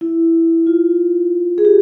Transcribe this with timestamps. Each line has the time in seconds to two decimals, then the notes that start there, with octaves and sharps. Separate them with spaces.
0.01 E4
0.67 F4
1.58 G#4
1.65 G4